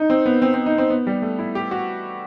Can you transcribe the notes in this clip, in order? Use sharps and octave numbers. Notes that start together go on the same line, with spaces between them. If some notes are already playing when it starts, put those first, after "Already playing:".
Already playing: D#4
C4
B3
C4
C4
D#4
C4
B3
G3
A3
E4
G4
F#4